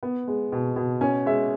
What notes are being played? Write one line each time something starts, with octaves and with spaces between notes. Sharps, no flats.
B3
G#3
B2
B2
C#4 G#5
G#3 E5